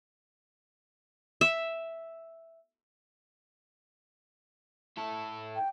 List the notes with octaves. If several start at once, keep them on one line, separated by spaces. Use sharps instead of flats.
E5
E4 A4
G5